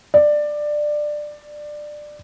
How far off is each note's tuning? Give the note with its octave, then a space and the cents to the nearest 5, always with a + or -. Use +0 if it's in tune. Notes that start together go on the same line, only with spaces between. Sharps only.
D5 +15